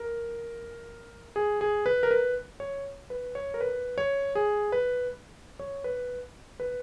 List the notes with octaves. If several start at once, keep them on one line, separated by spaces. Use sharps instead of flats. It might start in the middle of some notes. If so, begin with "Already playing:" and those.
Already playing: A#4
G#4
G#4
B4
A#4
B4
C#5
B4
C#5
A#4
B4
C#5
G#4
B4
C#5
B4
B4